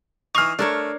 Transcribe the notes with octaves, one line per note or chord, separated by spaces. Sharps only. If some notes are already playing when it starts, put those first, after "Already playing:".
E3 D#4 C#6 F6 C7 F7
A3 D4 A#4 C#5